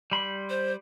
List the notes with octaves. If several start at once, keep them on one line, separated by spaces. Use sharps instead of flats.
G3 B5 C6
C5